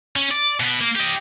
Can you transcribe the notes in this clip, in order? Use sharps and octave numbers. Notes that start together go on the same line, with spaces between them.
C#4
D5
B2 B3
A#3
G4 D#5